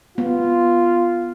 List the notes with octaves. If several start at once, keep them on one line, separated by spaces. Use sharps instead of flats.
B3 F4